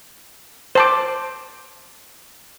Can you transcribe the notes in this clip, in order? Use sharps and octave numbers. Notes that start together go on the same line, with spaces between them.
C5 A5 D6